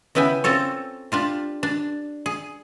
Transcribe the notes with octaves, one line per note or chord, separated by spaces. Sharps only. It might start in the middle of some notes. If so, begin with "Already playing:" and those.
C#3 B3 E4 G5 G#5
C4 C#4 F4 A4 C#5
D4 F4 G4
D4
G#4